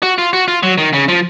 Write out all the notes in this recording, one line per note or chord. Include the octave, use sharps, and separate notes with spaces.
F#4
F4
F#4
F4
F#3
D#3
C#3
F3